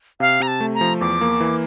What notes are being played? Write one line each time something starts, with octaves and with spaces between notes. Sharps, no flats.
C3 F5
C3 A#5
A5
A3
A#5
F3
E2 D6
A#3
E3